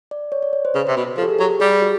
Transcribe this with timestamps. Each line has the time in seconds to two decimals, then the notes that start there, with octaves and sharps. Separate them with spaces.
0.11 D5
0.32 C#5
0.42 D5
0.53 C#5
0.65 C5
0.75 C#3 B4
0.88 C3
0.97 B2
1.17 F3 A4
1.23 G4
1.28 G#4
1.39 F#3 G4
1.60 G3 G#4
1.70 G4
1.82 F#4